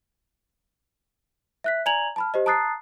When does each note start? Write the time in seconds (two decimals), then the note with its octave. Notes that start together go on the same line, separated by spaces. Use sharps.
1.64 E5 F#6 B6
1.86 D5 G#5 A#5 G#6 F7 F#7
2.16 A5 B5 F6
2.34 G4 C5 D#5
2.46 A5 A#5 D#6 F#6 A6 C7